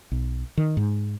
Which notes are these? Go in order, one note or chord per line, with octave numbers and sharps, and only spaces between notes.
B1
D#3
G#2